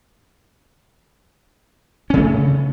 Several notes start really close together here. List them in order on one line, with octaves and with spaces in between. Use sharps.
C#4 C#3 A3